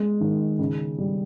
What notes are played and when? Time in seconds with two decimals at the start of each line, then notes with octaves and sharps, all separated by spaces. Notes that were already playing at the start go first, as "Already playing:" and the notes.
Already playing: G#3
0.21 D#3
0.59 C#3
0.98 G3